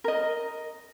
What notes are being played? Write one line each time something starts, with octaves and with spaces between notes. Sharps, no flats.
A#4 D#5